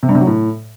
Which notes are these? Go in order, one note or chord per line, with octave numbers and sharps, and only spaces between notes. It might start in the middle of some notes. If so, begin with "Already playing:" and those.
C3
G2
C3
F#3
A2